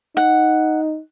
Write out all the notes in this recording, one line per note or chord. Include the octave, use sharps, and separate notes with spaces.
D#4 F#5